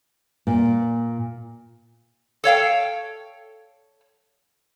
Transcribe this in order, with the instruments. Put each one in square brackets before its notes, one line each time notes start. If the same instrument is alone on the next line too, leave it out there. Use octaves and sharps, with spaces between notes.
[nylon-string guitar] A#2
[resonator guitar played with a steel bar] A4 C#5 F5 G5